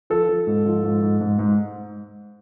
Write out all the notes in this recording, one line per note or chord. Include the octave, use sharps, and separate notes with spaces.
F3 A4
F3
G#2
F3
G#2
G#2
G#2
G#2